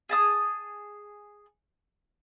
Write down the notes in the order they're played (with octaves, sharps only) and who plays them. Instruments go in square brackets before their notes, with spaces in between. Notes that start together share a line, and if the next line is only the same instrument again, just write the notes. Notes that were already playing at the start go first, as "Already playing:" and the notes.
[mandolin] G#4 A5 D#6